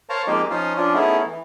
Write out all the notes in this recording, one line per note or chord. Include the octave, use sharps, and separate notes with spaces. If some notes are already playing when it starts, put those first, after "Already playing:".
A#4 C5 C#5 F5 A5 A#5
F3 G#3 A#3 C4 D#4 G4
F3 C#4 D#4 F4 C5
F3 C#4 D4 F4
A3 B3 C#4 D#4 E4 G#4
E3